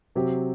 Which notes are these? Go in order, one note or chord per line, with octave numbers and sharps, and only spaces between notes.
C3 F#3 C4 G4